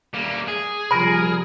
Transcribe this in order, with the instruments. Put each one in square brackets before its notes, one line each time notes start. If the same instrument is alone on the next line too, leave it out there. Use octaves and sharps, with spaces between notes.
[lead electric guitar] G3 A#3
G#4
[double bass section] C3 F3 G3 [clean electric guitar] A#4 [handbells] B5